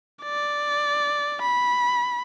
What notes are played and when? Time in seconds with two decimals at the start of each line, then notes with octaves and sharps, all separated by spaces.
0.23 D5
1.42 B5